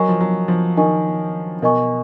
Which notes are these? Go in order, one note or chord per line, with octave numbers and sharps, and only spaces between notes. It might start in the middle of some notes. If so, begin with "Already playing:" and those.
Already playing: F#3 A#4 D#5 G#5 C#6
F3
F#3
F3
D#3 A#4 D#5 G#5 C#6
B2 A#4 D#5 G#5 C#6